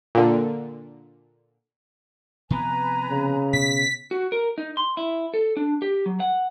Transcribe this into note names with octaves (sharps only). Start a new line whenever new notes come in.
A#2 D3
C3 F3 B3 B4 G#5 A#5
C#3
B2 B6
F#4
A#4
D#4
C6
E4
A4
D4
G4
F#3
F#5